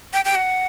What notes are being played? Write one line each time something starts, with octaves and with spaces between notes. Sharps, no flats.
G5
G5
F#5